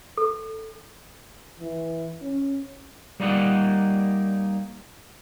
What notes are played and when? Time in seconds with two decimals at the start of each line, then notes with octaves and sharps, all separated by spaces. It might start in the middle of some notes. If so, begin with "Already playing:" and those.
0.17 A4
1.60 E3
2.22 C#4
3.20 G3 A#3 D#4 D5 F#5